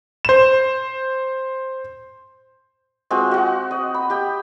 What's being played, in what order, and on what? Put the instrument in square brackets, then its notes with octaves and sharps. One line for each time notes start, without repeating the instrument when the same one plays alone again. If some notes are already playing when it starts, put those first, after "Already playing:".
[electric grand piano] C5 E7
[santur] G#3 C4 F4 F#4
F#4 F#5
D#5
B5
G4 G5